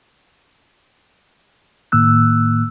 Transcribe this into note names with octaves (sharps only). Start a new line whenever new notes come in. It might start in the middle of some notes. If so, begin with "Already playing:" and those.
A2 D#3 A#3 E6 F#6